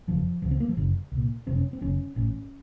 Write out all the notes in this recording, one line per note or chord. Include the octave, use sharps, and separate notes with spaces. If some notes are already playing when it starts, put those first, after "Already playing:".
F#1 F2 C#3 F3
C#2 C#3 F3
C4
A#3
F3
F#1 F#2 C#3
C2
A#2
F#1 F2 C3 C4
C#4
C4
F#1 F#2 C#3 C#4
A1 A2 C#4